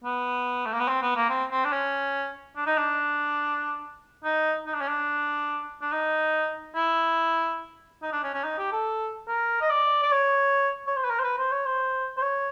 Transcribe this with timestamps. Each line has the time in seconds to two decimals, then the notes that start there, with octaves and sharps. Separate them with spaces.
0.04 B3
0.65 A3
0.73 A#3
0.80 B3
0.88 C4
1.02 B3
1.16 A#3
1.30 C4
1.51 C4
1.64 D4
1.72 C#4
2.56 D4
2.66 D#4
2.77 D4
4.24 D#4
4.66 D#4
4.74 D4
4.81 C#4
4.88 D4
5.81 D4
5.92 D#4
6.75 E4
8.02 D#4
8.12 D4
8.23 C#4
8.34 C#4
8.44 D#4
8.58 G4
8.72 A4
9.28 A#4
9.62 D#5
9.70 D5
10.03 D5
10.12 C#5
10.87 C#5
10.96 C5
11.04 B4
11.10 A#4
11.19 C5
11.24 B4
11.38 C5
11.51 C#5
11.66 C5
12.17 C5
12.22 C#5